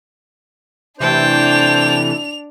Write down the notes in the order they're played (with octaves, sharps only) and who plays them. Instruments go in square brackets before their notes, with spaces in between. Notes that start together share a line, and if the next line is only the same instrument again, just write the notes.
[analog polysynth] C3 E3 A3 [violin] D4 F7 [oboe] C5 [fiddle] G5 A5